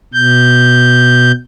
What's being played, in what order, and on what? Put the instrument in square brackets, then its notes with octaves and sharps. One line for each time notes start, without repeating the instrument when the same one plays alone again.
[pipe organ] B2 G6